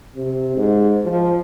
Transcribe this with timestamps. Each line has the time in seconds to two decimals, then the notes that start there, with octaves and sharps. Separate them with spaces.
0.16 C3
0.56 G#2
1.05 F3